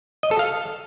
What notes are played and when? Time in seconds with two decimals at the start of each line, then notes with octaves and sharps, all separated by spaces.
0.23 D#5
0.31 A4
0.39 F5